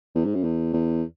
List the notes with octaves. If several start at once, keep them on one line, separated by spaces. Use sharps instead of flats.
E2
G#2
F#2
E2
E2